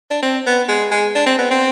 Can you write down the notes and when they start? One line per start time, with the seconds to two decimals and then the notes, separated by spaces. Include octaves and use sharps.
0.11 D4
0.22 C4
0.46 B3
0.69 G#3
0.91 G#3
1.15 D4
1.26 C4
1.38 B3
1.51 C4